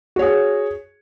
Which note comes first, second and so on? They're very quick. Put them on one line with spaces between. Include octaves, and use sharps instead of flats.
F#4 C#5 G#4